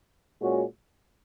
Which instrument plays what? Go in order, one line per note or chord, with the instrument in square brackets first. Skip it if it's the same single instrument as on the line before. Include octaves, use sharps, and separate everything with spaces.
[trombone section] A#2 G#3 C#4 F#4